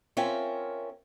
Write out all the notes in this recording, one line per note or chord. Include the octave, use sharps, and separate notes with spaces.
C4 C#4 F4 A#4 E5